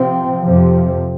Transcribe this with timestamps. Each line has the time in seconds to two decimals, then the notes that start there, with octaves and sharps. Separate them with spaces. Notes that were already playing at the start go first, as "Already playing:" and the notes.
Already playing: C3 F3 C4
0.42 F2 C3 F3